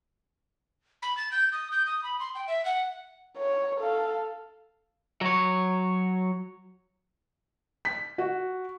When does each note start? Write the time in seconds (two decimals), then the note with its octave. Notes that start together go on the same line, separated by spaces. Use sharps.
1.02 B5
1.17 A6
1.32 G6
1.52 D#6
1.72 G6
1.86 D#6
2.04 B5
2.20 C6
2.35 G5
2.47 E5
2.65 F#5
3.37 C#5
3.80 A4 F5
5.21 F#3 C#5
7.85 B6
8.18 F#4